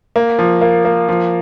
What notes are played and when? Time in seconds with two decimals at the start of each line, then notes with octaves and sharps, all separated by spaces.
0.16 A#3
0.39 F3
0.61 A#3
0.85 A#3
1.09 F3